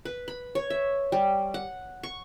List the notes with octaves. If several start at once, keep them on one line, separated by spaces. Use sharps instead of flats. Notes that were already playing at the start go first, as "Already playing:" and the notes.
B4
B5
C#5
E5
G3
F#5
C#6